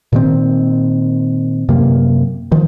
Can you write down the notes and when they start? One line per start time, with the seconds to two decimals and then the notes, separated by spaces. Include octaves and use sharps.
0.13 A#2 D#3 C4
1.69 F#2 C3 A#3
2.52 D#3 F3